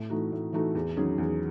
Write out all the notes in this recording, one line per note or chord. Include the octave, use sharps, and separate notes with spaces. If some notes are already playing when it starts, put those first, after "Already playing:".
Already playing: A2
E3 A3 D#4 F#4
A2
E3 A3 D#4 F#4
E2
D#3 F#3 C#4 G#4
E2